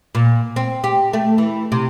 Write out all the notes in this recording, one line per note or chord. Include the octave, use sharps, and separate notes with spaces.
A#2
C4
G4
A3
E3
C3